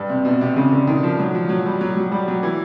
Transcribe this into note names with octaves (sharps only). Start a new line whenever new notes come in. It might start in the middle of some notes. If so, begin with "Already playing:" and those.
Already playing: G2
C3
B2
C3
C#3
D3
D#3
F3
F#3
F3
F3
F#3
G3
F#3
F#3
G3
F#3
E3